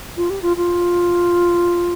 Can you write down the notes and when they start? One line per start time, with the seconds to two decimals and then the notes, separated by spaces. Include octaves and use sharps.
0.17 F4
0.30 G4
0.42 F4
0.57 F4